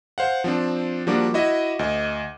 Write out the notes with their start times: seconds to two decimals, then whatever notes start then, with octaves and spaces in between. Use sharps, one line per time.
0.18 C5 F5 F#5
0.44 F3 C4 D4
1.07 F3 G3 A#3 D4 F#4 D6
1.34 E4 F#4 D#5 E5
1.79 D2 D#5